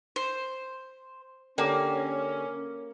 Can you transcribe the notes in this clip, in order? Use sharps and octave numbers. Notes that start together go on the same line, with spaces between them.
C5
D3 A#3 C#4 G4